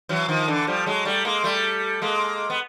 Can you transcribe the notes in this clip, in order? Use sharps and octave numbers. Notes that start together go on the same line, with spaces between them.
E3 F#3
D#3 F3
D3 E3
F3 G3
F#3 G#3
G3 A3
G#3 A#3
G3 A3
G#3 A#3
B3